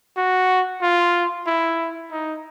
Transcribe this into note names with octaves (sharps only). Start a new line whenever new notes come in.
F#4
F4
E4
D#4